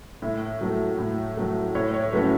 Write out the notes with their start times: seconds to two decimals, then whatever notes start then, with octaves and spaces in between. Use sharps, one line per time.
0.22 A2 E5
0.61 F#3 A3
0.98 A2
1.37 F#3 A3
1.75 A2 C#5
1.94 C#5
2.13 F#3 A3 C#4 B4